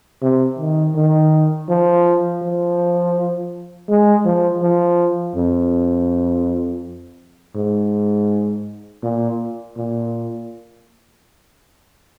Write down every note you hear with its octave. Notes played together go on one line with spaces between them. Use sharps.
C3
D#3
D#3
F3
F3
G#3
F3
F3
F2
G#2
A#2
A#2